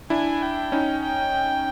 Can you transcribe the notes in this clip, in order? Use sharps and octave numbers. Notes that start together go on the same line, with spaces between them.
D4 E4 G#5
G5
C#4 D#4
G5